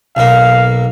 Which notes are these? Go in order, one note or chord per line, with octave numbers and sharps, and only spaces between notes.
B1 A#3 F5